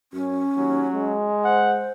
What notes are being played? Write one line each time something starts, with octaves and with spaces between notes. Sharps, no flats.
F#2 C#4
D#2 F#3
G#3
C5 F#5